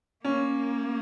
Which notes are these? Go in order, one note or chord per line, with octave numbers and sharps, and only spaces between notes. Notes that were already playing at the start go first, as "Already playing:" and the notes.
A#3 C#4